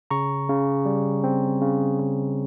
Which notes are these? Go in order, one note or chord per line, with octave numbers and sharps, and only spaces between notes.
C#3 A#5 C#6
C#3
G3
C4
C#3
C#3